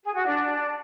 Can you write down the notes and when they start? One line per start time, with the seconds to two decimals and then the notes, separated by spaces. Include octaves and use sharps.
0.04 G#4
0.15 F#4
0.26 D4